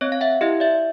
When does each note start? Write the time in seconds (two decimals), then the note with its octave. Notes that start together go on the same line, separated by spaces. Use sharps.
0.01 C4 C#5 D#5
0.12 F5
0.21 E5 F#5
0.41 E4 G4 D#5 F5
0.60 D5 E5